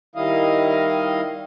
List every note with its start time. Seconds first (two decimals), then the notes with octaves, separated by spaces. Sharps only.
0.16 D#3 G3 E4 D#5 F5